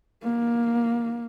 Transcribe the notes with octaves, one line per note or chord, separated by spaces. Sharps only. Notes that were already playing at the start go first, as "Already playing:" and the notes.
A#3